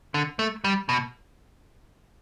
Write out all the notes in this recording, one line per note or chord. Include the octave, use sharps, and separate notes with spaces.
D3
A3
G3
B2